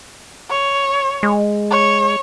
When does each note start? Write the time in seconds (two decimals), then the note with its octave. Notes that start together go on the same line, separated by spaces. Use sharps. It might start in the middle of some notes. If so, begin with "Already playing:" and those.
0.50 C#5
1.23 G#3
1.71 C#5